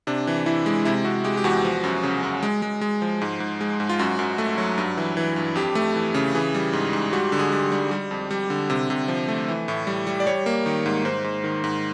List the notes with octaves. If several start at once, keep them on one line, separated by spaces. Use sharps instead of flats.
C3 D4
E3
E3 E4
G#3
C3 E4
C3 F#4
G#3 G4
G4
E2 F#4
F3
F#2
C#3
F#2
G#3
G#3
G#3
F3
G#2
G#2
G#3
G#2
F4
F#2 F#4
F#2
A3
F#3
G2
E3
E3
G2
F2 G4
A3
E3
C#3
E3 G#4
G3
G#2
G#2
G3 F#4
D3
G#4
G3
G3
G3
F2
G3
D3
C3
C3
F3
A3
E3
A2
G3
G3
D5
G3 C#5
A#3
D#3
G#2
G#2 C5
G#2
D#3
G#2